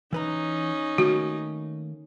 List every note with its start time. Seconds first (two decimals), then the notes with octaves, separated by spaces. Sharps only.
0.13 E3 C#4 D#4 B4 A#5
0.98 D#3 A3 A#3 F#4